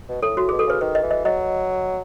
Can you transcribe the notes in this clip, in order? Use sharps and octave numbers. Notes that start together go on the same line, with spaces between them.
B2
A2 A4
A2 F#4
G#4
B2
A4
C#3 B4
D#3 B4
D#5
E3
D#5
F#3 D#5